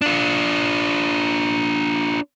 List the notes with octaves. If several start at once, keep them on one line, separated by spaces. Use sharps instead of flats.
D4 F4